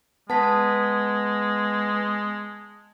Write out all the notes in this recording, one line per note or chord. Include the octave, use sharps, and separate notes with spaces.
G#3 B3 A5 B6